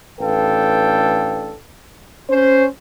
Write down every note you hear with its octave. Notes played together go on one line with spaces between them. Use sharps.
A1 D4 A4 B4 F5 G5
C#4 C5